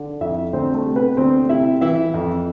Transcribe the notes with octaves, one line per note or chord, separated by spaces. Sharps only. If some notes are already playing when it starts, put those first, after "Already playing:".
Already playing: D3
F2 E4 E5
D2 C4 C5
A3 A4
C3
B3 B4
D2 C4 C5
C3 E4 E5
E3 E4 E5
F2